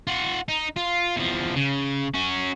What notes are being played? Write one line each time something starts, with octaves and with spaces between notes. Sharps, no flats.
F4 F#5
D#4
F4
E2 F3
C#3
C#4 F#4